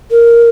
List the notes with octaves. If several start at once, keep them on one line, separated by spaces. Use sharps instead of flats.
A#4